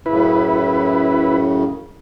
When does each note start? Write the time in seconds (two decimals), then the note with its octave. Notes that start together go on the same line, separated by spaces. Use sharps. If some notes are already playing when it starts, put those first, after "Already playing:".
0.06 F#2 A2 C#3 E4 B4